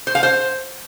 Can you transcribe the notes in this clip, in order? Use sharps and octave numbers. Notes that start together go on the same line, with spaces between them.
C5
F5
C5